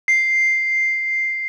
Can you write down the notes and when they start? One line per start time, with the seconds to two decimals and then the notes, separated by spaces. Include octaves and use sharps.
0.08 C7